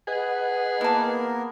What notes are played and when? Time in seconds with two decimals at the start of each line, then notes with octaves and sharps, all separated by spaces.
0.08 G#4 B4 D#5 F#5
0.81 E3 A#3 B3 A#4 A5